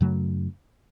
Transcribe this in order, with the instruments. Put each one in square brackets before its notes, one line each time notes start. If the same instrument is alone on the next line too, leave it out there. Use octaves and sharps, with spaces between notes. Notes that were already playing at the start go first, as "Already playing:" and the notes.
[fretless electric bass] F#2 C#3 F#3 A3